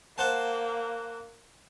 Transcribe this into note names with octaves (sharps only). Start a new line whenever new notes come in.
A#3 C5 F#5 A5